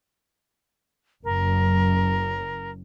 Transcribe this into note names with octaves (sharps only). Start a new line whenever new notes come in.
F#1 F#2 A#4